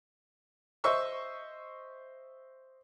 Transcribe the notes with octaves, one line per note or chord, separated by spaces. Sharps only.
C5 D#5 E5 C#6 E6